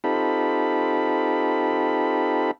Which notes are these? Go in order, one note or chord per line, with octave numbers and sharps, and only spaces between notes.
C4 D#4 F4 G4 A4 B5